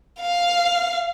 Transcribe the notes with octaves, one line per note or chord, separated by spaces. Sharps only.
F5